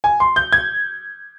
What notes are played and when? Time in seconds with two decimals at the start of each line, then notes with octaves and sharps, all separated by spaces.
0.04 G#5
0.20 C6
0.36 G6
0.53 G#6